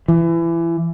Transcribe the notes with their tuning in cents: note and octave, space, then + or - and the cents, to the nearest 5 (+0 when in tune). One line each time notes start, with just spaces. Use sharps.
E3 +25